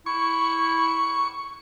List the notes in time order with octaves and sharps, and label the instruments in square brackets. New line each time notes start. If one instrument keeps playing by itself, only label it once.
[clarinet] E4 [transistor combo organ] C#6